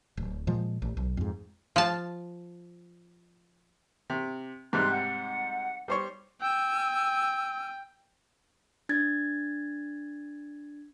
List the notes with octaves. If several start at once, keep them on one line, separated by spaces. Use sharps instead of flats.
D1
A#2 F3 G#3
A1
B1
F2 G#2
F3 A5
C3
G#2 C3 G3 C6 F6 F#6
F#5
G3 C5 C#5
G5 G#5 E6
D4 G#6 A6